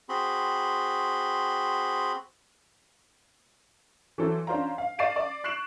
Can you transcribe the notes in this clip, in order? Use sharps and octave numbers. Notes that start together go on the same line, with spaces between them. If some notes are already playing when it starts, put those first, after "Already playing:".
C4 F#4 G#4 B5 C6
E3 F#3 A4 C5
C#4 D4 F4 C5 F5 A#5
F5
D5 F5 A6 C7 D#7 E7
D5 D6
C#6 F#6 C7 D7 E7 F#7